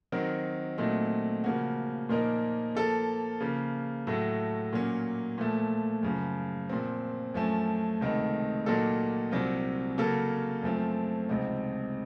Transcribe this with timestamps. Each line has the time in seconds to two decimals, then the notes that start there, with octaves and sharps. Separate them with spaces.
0.12 D#3 F#3 C4 F#4 A#4
0.78 A#2 F#3 A3 C4 D#4
1.44 C#3 F3 A#3 C#4 F#4
2.09 A#2 F3 A#3 D#4 A#4
2.75 F3 A#3 F4 A4
3.40 C#3 F3 A#3
4.07 A2 F#3 A3
4.73 A#2 F#3 A#3 C#4
5.38 A#2 F3 A3
6.03 F#2 C#3 F3
6.69 A#2 F3 C4
7.34 F#2 F3 A3 C#4
8.01 C#2 C3 D#3 A3 D#4
8.66 A#2 F#3 A#3 D#4 A4
9.31 C2 C3 F#3 C4 F4
9.98 C#3 F#3 A#3 C#4 A4
10.63 F#2 F3 A3 C4 F4
11.29 C#2 C3 F3 C4 D#4